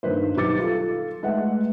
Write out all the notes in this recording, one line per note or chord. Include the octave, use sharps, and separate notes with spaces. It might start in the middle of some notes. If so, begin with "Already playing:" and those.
G2 D#3 A#3 B4 C5
B1 D#3 G4 D6 A6 C#7
F4 A4
G#3 A3 B4 E5 F#5